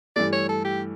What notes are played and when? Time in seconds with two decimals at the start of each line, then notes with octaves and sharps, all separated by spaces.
0.16 G2 E3 A3 D5
0.32 C#5
0.49 A4
0.65 G4